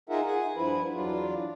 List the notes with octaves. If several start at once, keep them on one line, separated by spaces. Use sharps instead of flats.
D#4 F4 G#4 A#4 E5 F#5
G#4 F#5
G2 F3 E4 B4
E2 F#3 D4 F4